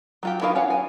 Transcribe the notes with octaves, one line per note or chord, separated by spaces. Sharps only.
F#3 F4 G4
B3 E4 F#4 A#4 F5
C#4 C#5 F5 F#5
G#5